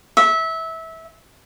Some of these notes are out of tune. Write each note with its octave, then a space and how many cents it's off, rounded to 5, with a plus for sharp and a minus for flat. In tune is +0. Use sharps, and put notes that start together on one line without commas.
E5 -20